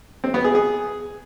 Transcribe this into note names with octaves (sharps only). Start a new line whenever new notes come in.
C4
B3
G#4
G#4